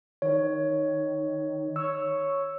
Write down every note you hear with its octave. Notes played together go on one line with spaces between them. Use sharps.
D#3 C#5
C#5 E6